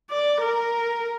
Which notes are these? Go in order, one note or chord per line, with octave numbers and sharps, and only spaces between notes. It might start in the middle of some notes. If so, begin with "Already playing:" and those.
D5
A#4